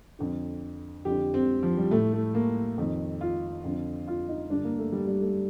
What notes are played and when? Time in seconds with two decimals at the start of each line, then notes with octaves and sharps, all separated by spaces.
0.19 F2 D3
1.05 F2 D3 G4
1.34 C4
1.63 F3
1.77 G3
1.91 A2 A3
2.14 A3
2.35 A#3
2.78 F2 D#3
3.21 F4
3.64 F2 D3
4.07 F4
4.29 D#4
4.50 G2 D3 D4
4.64 A#3
4.78 A3
4.92 G3
5.07 G3
5.21 A3